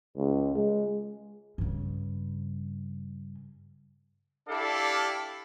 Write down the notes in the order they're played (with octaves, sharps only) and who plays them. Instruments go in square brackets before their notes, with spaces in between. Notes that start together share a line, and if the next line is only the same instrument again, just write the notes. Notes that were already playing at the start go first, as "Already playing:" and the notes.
[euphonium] C#2
G#3
[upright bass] G2 C#3
[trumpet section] D4 E4 G4 A4 D5 F5